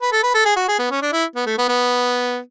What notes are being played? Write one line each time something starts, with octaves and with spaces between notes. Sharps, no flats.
B4
A4
B4
A4
G#4
F#4
G#4
B3
C#4
D4
E4
B3
A3
B3
B3